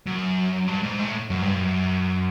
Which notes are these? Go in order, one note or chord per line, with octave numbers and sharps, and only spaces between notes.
F#2
G2
G#2
A2
F#2
G2
F#2